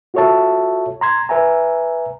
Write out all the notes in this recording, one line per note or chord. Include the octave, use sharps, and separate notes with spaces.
F4 F#4 A4 C#5 E5 A5
A#5 C6 G#6
B4 E5 G#5 A#5